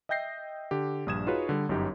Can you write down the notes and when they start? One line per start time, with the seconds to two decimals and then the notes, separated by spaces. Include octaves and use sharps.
0.09 D#5 E5 G5 G6 A#6 C7
0.71 D3 G4
1.06 A#1 G2 D#6 G#6 E7
1.26 D#4 F4 F#4 G#4 B4 C#5
1.49 D3 G3
1.69 G1 F#2 D#4 G4